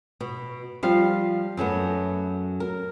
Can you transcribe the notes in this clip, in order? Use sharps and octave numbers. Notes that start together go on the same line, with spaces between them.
B2
F3 G3 F5
F#2 F#3 A3 B3
A#4